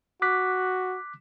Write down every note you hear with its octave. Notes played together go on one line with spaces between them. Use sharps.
F#4 D6 F#6 B6